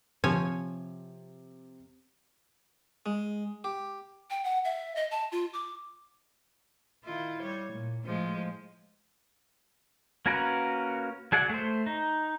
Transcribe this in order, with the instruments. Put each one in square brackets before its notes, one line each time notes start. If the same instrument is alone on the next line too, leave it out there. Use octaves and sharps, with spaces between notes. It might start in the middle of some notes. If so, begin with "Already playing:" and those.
[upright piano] C3 [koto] F3 C#5 G#5
[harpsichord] G#3
G4
[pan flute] G5
F#5
E5
D#5
A5
F4
D6
[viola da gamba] D#3 E4 F4
G3 C#5
A#2
A2 F3 G#3
[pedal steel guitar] A#3 C#4 F#4 A#4 B4
F#3 G#4 D5 F#5
A3 C5
D#4